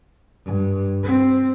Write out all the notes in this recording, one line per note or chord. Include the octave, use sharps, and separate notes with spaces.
G2
C4